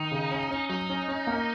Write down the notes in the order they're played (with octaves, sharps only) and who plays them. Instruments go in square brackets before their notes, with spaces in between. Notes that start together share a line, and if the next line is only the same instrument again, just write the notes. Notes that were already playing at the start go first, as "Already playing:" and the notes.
Already playing: [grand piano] D#3 [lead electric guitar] D#4
[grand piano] C#3
C#4
C#4
[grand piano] F#3 [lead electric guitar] D#4
[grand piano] C#4
C#4
A#3